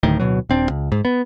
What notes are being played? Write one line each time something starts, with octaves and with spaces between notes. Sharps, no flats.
D1 D2 A2 D#3
D1 G#1 B2 F#3
D#1 C4 D4
C#2
G#2
B3